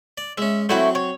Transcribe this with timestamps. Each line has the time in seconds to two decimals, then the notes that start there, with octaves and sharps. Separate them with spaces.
0.18 D5
0.38 G#3 C#4 E5
0.69 F#3 A3 C4 E4 F#4
0.95 C#5